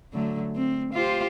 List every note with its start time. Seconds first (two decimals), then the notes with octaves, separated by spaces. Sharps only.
0.13 D3 F#3 A3
0.56 C4
0.93 F4 G4 C5